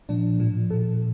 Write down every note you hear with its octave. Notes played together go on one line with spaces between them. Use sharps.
A#2 F3 D4
A2 F3
A#2 F3 A4